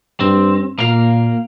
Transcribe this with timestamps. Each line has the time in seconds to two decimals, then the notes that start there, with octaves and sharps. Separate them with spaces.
0.20 G2 C4
0.79 A#2 A#3 F5